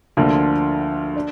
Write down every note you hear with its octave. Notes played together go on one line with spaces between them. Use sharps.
D2 D3 F3 A#3
D4